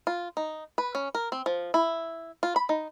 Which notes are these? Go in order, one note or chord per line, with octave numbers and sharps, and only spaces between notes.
F4
D#4
B4
C#4
A#4
C4
F3
E4
F4
B5
D#4